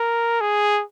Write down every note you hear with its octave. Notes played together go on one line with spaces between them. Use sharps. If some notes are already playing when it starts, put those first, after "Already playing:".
Already playing: A#4
G#4